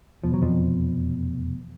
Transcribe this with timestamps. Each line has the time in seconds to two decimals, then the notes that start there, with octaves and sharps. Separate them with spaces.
0.24 F1 E2 B2 F3
0.34 F#3
0.42 F2 F3